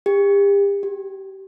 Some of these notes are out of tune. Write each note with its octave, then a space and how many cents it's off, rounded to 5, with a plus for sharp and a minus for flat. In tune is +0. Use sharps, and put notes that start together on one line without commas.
G4 +35
G4 -25